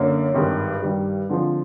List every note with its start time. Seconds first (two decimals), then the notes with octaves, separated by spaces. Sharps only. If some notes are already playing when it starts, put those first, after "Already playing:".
Already playing: F#2 D3 A#3
0.34 G#1 G2 D#3 G#3
0.82 G2 D#3 G3
1.29 D3 F3 G#3 C4 F4